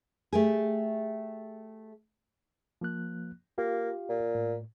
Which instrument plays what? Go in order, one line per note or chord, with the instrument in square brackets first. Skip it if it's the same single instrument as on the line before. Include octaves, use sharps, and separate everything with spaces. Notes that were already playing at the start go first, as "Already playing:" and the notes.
[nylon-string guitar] A3 G4 G#4
[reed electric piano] F3 A#3 F#6
[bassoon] A#3 [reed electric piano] F4 G4 F5
[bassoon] A#2
[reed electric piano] A2